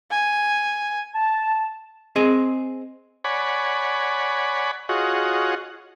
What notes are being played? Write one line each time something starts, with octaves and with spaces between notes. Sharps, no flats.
G#5
A5
C4 G#4 D#5
C#5 D5 F#5 G#5 B5
F4 F#4 G#4 C#5 D#5 F#5